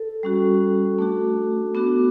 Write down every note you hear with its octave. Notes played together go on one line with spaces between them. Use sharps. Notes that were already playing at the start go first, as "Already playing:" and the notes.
Already playing: A4
G3 C#4 F#4
A3 D4 F#4
B3 D4 F#4